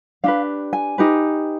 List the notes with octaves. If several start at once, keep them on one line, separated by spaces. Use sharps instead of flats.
D4 G4 B4 F5
G#5
D#4 G4 B4